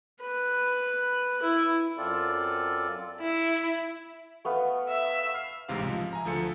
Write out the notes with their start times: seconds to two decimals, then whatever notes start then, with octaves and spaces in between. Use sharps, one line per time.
0.21 B4
1.42 E4
1.98 F#2 C4 F4 A4 D5
3.21 E4
4.45 A3 B3 F5
4.89 E5
5.34 F6 C7
5.69 A1 G#2 C3 G#3 F5 F6
5.83 C#2 F3
6.13 E5 G#5 A#5
6.25 D2 F3 A4 C#7